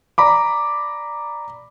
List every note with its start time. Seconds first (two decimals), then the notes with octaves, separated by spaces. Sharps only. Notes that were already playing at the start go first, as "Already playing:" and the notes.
0.18 D5 A#5 B5 D6